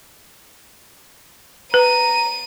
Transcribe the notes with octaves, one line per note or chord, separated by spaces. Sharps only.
B4 A#5 D#7